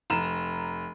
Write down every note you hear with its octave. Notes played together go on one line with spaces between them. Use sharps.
F1 A#5 E7